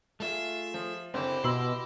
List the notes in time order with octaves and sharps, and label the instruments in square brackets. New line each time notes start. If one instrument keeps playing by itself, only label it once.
[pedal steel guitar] A3 F4 G#4 [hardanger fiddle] E5
[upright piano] F3
[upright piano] F#1 D3 C5 [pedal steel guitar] C4 [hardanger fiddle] E4 G4
[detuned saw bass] B2 [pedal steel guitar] D#5 C6 [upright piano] B5 E6 F#7